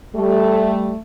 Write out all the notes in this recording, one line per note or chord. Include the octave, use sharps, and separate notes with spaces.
G3 A3